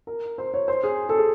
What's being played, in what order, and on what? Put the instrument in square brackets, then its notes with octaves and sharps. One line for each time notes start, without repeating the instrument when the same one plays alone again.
[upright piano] A#4
C5
C#5
C5
G#4
A4
G#4